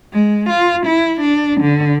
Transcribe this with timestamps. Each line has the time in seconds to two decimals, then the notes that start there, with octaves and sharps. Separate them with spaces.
0.13 G#3
0.49 F4
0.86 E4
1.21 D4
1.61 D3